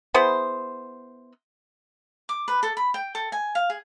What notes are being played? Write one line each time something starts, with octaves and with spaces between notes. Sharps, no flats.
B3 E4 G#4 C5
D6
B4
A4
B5
G5
A4
G#5
F5
G#4